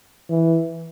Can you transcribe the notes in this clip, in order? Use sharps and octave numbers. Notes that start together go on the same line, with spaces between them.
E3